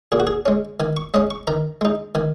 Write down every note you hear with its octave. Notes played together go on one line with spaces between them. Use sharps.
A#2 G#4
F#4
G#4
G#3 C#4
D#3 G#5
C#6
G#3 C#4 D#5
C#6
D#3 A#5
G#3 D#4
D#3 G#5